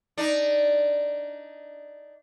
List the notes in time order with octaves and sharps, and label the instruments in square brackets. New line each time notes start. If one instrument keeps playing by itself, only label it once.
[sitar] D4 D#4